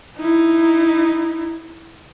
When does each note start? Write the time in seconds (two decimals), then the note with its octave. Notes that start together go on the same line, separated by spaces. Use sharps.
0.17 D#4 E4